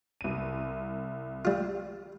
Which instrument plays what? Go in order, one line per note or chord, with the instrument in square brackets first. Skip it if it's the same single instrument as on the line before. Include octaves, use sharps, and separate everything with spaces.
[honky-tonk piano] C2 D#7
[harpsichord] G3 F4